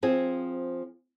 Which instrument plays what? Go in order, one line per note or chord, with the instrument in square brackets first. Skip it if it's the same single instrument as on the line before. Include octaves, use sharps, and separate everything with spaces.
[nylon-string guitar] F3 C4 G#4